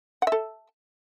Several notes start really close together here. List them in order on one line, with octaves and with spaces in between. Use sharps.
F#5 E5 A4